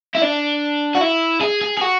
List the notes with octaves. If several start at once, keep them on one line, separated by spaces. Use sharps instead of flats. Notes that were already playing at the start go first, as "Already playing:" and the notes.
E4
D4
F#4
E4
G#4
G#4
G#4
F#4